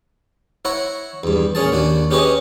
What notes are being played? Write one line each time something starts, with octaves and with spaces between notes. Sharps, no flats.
E4 C#5 F#5 A#5
E2 G2
A#2 C#4 G#4 A5
D#2 D4 F#4
C#4 G4 G#4 B4 C#5 D#5